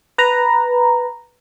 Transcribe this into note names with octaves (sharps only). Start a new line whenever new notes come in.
B4 A#5